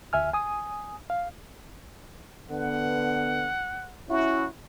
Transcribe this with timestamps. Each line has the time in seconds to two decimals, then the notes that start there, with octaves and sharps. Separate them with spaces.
0.13 D2 E5 G#5 F6
0.33 G#5 D#6
1.10 F5
2.51 D3 B3 F#5
4.10 C#4 E4 F#4